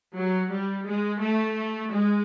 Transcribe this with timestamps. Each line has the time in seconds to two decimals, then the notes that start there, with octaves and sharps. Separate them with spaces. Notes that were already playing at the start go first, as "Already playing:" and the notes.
0.17 F#3
0.51 G3
0.87 G#3
1.22 A3
1.91 G#3